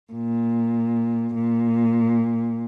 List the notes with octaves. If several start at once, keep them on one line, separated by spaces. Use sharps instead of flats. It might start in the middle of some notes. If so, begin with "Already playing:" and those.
A#2
A#2